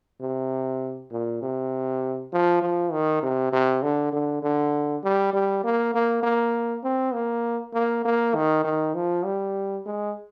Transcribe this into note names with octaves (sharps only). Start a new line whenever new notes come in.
C3
A#2
C3
F3
F3
D#3
C3
C3
D3
D3
D3
G3
G3
A#3
A#3
A#3
C4
A#3
A#3
A#3
D#3
D#3
F3
G3
G#3